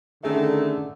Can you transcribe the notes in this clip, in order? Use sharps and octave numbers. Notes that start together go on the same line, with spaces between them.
D3 D#3 A3 C#4 G#4 E5